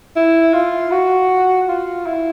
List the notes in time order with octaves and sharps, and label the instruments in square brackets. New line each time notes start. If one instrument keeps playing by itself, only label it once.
[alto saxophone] E4
F4
F#4
F4
E4